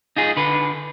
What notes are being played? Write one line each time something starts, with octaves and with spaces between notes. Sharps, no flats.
D#4 F4 G#4
D3 B4